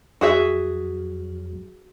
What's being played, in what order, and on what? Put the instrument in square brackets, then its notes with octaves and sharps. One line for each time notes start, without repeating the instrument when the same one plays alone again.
[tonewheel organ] F2 F#3 [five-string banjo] F#4 G#4 E5